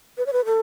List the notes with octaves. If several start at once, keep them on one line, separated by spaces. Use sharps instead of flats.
B4
C#5
B4
A4